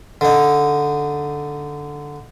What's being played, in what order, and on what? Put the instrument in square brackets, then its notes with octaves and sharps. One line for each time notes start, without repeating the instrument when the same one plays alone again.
[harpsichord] D3 D#4